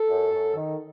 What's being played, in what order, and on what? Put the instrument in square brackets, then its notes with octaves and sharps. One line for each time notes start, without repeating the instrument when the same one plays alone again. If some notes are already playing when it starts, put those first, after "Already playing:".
Already playing: [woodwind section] A4
F#2
F#2
D#3